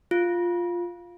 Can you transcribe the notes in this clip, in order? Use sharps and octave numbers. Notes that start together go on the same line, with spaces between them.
F4